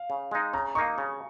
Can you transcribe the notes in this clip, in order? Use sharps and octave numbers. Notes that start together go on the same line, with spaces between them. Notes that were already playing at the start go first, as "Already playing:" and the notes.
Already playing: F5
C#3
G#3 D#4
C#3 A#5
A#3 D#4 C#6
C#3